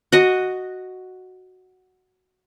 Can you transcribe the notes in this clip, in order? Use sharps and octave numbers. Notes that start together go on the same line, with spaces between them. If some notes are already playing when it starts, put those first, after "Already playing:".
F#4 D#5